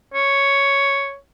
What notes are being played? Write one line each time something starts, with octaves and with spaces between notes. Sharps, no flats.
C#5